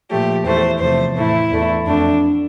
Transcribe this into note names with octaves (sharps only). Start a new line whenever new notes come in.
A#2 F3 A3 G4
E2 E3 A3 C5
E2 C3 F3 A3 C5
A2 E3 A3 E4
E2 D3 A3
F2 D3 A3 D4